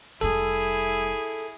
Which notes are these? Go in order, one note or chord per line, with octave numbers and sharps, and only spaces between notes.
F1 G3 E4 G#4 A4